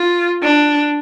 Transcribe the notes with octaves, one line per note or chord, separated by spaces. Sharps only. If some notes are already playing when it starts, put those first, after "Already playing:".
Already playing: F4
D4